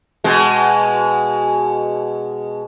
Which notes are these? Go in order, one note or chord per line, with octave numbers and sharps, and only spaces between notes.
B2 G#3